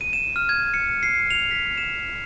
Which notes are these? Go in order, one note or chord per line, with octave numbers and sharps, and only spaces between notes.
D#7
E7
F6
G#6
C#7
C7
F7
B6
E7